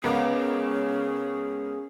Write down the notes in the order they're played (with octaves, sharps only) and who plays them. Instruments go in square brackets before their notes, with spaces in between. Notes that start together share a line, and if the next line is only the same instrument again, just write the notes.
[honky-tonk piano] C#2 A#4 D6 [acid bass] B3 [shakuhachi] C#4 [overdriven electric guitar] G#4 F5